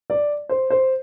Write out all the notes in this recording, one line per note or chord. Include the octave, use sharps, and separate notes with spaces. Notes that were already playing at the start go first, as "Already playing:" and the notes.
D5
C5
C5